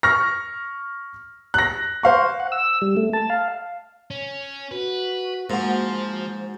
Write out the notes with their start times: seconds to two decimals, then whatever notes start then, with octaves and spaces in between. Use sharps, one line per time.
0.03 C#6 F6 A#6
1.54 F#6 A#6
2.03 C5 F5 C#6
2.40 F#5
2.52 E6
2.82 G3
2.97 A3
3.13 A5
3.30 F5
4.10 C#4
4.71 F#4 B4
5.50 G#2 F3 A#3 F#4 C5